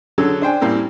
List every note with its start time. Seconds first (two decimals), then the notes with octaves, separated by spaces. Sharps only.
0.18 D3 F#3 G#4 A4
0.42 D4 C5 G5 G#5
0.61 A2 G3 A#3 C4 E4